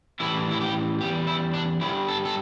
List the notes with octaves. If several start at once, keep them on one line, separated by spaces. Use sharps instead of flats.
A2 E3 G3 E4
E4
G4
E2 E3 G3 G4
E4
D4
G2 D3 G3 E4
A4
A4